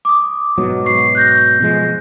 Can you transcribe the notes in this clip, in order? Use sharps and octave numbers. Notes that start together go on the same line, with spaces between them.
D6 D#6
G#2 B2 F#3
C#6 C7
F#6 G6 A#6
B2 F3 G#3